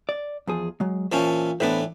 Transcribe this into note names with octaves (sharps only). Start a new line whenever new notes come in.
D5
E2 F3 G#4
F#3 G#3
A#2 E3 C#4 C5 A5
A2 E3 B3 D4 B4 C5